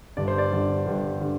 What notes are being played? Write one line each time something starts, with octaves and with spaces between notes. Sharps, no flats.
G1 G2 D3 G3 D5
C5
D5
G1 G2 D3 G3
G1 G2 D3 G3
D3 G3